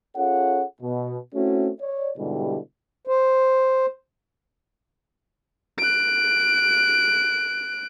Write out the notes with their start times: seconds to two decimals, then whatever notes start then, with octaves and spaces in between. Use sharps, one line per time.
0.16 C#4 F4 G#4 A4 C#5 F#5
0.81 B2
1.35 A3 C4 C#4 E4 F#4
1.81 C#5 D5
2.17 G#2 B2 D3 G3 E4 G4
3.07 C5
5.78 F#6 D7